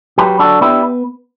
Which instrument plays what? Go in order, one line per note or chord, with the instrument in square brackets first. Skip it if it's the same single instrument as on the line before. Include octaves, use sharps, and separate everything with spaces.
[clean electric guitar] F#3 G4 B4
D4 F#4 A4
B3 E4 G4